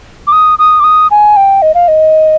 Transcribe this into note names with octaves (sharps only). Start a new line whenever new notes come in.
D6
D#6
D#6
D6
D#6
G#5
G5
D#5
F5
D#5